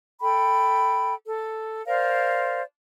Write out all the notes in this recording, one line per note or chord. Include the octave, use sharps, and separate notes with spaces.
A4 G5 B5
A4
A#4 C5 D5 F5